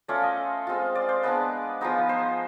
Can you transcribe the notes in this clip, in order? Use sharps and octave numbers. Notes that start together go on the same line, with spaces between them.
A3 C#4 F4 D5
D#5
G#3 C4 F4
D5
C5
G#3 B3 D4 B4
F3 G#3 B3 D#4
C5